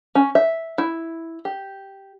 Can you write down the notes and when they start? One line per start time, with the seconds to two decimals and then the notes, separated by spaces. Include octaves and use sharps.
0.15 C#4
0.35 E5
0.78 E4
1.45 G4